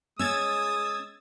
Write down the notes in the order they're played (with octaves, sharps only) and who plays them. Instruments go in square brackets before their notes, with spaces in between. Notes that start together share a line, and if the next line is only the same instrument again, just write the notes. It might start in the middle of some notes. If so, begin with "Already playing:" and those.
[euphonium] G#3 [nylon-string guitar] C#4 [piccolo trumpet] D#6 [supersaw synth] E6 G#6 A6